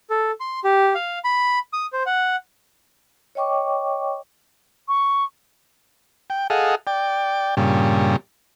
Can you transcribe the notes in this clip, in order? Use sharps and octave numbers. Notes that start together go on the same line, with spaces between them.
A4
C6
G4
F5
B5
D#6
C5
F#5
C#5 D#5 G5 C#6 D6
C#6
G5
G#4 A4 D#5 F5 F#5
D5 G5
G2 A#2 C#3 G3